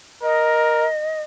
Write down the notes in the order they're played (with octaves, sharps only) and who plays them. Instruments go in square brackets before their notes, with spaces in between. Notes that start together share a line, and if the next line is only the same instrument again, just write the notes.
[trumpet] A#4 [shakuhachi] D#5